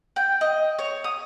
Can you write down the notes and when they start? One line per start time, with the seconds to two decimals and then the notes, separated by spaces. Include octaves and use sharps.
0.16 G5
0.41 D#5
0.79 C#5
1.04 D#6